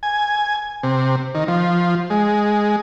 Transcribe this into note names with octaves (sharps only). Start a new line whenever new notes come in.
G#5
C3
D#3
F3
G#3